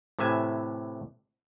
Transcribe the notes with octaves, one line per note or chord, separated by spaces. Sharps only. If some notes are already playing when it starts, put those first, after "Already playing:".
A2 C3 E3 E5 G#5